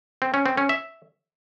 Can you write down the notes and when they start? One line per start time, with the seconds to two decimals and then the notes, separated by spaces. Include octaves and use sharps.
0.22 C4
0.34 C#4
0.46 C4
0.57 C#4
0.69 E5